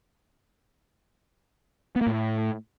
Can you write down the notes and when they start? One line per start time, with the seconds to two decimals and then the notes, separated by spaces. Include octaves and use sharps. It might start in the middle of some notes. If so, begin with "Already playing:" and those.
1.96 B3
2.01 A#3
2.07 A2